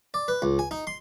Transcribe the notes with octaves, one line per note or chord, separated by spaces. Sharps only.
D5
B4
C#2
G#5
D#4
C6